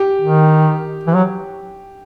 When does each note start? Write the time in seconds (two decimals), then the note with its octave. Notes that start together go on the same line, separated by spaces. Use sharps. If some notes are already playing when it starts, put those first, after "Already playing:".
Already playing: G4
0.21 D#3
1.07 E3
1.15 F#3